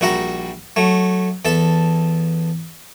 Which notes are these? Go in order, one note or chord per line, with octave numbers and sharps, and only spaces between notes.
A#1 G3 F#4 E5 F#5 A#5
F#3 A3
E2 A4 E5 A5